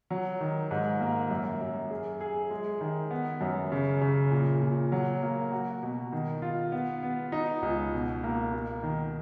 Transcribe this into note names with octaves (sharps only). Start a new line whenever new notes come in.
F#3
D#3
G#2
A#3
F#2
F#2
G#4
G#4
G#3
D#3
B3
F#2
C#3
C#3
A#2
A#2
F#3
A#3
F#4
B2
D#3
F4
B3
B3
D#4
C#2
B2
A#3
A#3
D#3